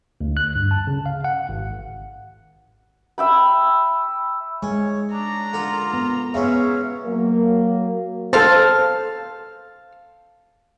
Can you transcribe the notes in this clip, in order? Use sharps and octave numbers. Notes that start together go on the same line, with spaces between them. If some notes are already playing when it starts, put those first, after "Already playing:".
D2
F#6
G2
A5
C#3
F5
F#5
G#1
E5 G5 B5
G#3 C#4 C#5
D4 A#5
D3 F4 A#4
B3
C#3 B3 C#4 C#5 E5 F5
F#3 A#3
A4 C5 F5 A5